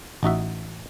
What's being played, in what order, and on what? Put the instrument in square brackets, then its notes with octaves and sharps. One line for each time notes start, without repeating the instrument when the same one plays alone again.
[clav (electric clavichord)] A1 D#4 F#4 E5